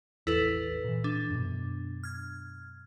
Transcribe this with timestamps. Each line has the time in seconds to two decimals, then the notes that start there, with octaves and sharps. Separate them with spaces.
0.27 A1 E2 E4 A4 B4
0.84 A#2 E3
1.04 D4
1.30 F#2 B2
2.04 F6 G#6